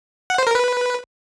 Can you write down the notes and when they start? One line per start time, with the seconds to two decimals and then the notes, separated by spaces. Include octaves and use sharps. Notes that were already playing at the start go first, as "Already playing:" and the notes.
0.30 F#5
0.38 C5
0.47 A#4
0.55 B4